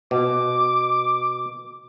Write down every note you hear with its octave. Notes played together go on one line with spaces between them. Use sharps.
B2 D6